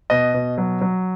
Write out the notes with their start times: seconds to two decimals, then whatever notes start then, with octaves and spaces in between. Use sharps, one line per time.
0.10 B2 D#5
0.34 B2
0.58 F#3
0.81 F#3